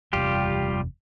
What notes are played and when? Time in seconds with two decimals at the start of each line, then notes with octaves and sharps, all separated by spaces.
0.13 F#1 E2 C3 G3 F4 G4